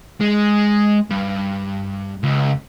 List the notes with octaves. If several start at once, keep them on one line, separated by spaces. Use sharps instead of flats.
G#3
G2
C#2